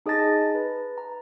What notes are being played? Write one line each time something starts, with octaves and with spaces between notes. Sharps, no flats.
D#4 G#4 D#5 A5 A6 A#6
B4
A#5